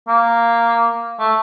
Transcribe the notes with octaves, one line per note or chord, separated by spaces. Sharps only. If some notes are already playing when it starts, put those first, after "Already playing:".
A#3
A3